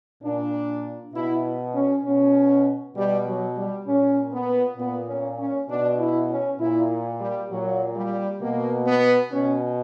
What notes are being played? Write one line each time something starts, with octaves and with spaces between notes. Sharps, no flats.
A#2 D4
B2 E4
C#4
B2 C#4
B2 G3
F#3
G3
A#2 C#4
B3
A#2 B3
C#4
C#4
B2 D4
E4
C#4
A#2 E4
G3
A#2 F#3
G3
B2 A#3
B3
B2 C#4